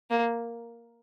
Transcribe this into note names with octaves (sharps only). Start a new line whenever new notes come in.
A#3